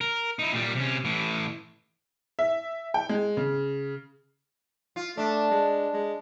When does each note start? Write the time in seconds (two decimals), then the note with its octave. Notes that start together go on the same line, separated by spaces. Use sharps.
0.01 A#4
0.39 D#4 E4
0.53 A#2 G3
0.75 C3 C#4
1.05 A2 E3
2.39 E5
2.94 G5
3.09 G#3
3.37 C#3
4.96 F4
5.17 A3 D4
5.51 G#3
5.93 G#3